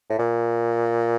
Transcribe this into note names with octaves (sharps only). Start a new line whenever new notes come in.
A2
A#2